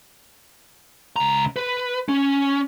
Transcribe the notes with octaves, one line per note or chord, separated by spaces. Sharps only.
C#2 A#5
B4
C#4